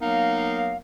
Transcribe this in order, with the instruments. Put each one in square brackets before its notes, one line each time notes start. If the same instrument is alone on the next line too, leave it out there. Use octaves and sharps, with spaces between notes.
[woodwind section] F#3 A#3 B3 D#4 A#4 F5